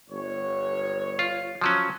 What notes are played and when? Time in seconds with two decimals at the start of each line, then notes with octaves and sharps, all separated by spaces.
0.10 G1 C#5
1.19 F4
1.61 F3 F#3 C#4